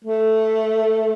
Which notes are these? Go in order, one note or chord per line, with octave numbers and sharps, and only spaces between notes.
A3